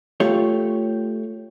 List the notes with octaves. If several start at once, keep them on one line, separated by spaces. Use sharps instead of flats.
A3 F4 G4 C#5